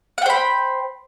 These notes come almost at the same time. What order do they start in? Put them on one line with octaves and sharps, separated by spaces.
F#5 G5 C5 B5